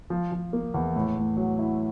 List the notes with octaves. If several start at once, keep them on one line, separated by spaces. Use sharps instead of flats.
F3
F3
A#3
E2
A2
A2
F#3
E4